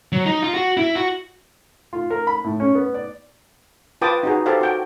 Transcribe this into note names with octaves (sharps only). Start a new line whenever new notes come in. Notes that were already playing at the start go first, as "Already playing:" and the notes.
F#3
D#4
F4
F#4
E4
F#4
F4
A#4
B5
A2
C#4
B3
D5
F4 B4 G5 A5 D6 D#6
D#4 F#4 G#4
G4 A4 C5 F5
F#4 G5